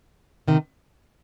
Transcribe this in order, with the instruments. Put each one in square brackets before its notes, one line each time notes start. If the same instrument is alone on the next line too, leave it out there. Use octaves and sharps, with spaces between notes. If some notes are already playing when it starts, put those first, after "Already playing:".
[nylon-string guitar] C3 D#3